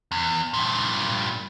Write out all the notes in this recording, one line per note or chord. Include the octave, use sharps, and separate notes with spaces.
E2
G2 A#2